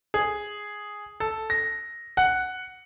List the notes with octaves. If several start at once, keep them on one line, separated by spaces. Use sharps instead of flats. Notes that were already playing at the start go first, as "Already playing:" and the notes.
G#4
A4
A#6
F#5